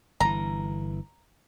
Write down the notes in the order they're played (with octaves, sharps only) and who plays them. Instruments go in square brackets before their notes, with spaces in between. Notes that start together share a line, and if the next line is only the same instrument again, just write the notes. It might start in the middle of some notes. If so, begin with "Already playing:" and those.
[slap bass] G1 E3 [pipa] A#5